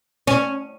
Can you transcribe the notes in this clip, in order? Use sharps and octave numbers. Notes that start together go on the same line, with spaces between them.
C#4